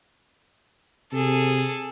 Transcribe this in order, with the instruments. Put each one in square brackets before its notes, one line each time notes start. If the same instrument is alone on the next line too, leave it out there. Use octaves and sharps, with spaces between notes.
[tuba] C3 [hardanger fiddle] G#4 A4